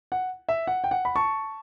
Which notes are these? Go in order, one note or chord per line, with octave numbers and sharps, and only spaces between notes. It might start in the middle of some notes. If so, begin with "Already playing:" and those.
F#5
E5
F#5
G5
F#5
B5
A5 C#6